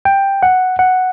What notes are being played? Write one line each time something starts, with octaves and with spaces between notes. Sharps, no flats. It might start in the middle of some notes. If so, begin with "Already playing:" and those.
G5
F#5
F#5